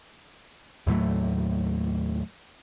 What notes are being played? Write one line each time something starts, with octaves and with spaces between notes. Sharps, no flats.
D#2 A2 F#3 A3